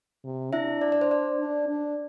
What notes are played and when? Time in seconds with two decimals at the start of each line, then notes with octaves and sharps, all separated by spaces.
0.24 C3
0.53 D4 E4 E5
0.81 D5
0.92 D5
1.01 C5
1.11 D5
1.39 D4
1.69 D4